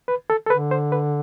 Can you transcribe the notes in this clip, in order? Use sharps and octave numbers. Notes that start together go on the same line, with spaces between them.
B4
A4
A4
D3 B4
C5
B4